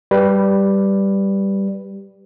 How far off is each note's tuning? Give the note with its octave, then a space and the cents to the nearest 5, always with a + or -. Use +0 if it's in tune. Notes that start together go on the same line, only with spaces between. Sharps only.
G3 +0 B4 +0